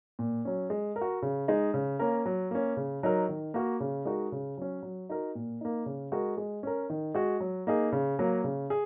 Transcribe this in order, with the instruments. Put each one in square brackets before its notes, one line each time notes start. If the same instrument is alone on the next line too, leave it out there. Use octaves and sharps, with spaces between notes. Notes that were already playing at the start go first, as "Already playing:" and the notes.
[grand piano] A#2
F#3 C#4
G#3
A#4
F#4
C#3
G#3 D#4
C#3
A#3 C#4 A#4
F#3
A#3 C#4
C#3
F#3 D#4 A#4
D#3
A#3 F#4 A#4
C#3
G#3 D#4 F#4 A#4
C#3
F#3 C#4
F#3
D#4 F#4 A#4
A#2
A#3 D#4
C#3
G#3 F#4 A#4
G#3
C#4 A#4
D#3
G#3 F#4
F#3
A#3 D#4 G#4
C#3
F#3 A#3
C#3
G#4